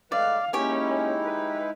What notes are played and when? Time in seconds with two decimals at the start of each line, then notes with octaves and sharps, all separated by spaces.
0.12 G#3 A3 B4 D5 F5
0.53 G#3 A#3 C#4 D#4 E4 G4 C#5 G#5
1.24 B4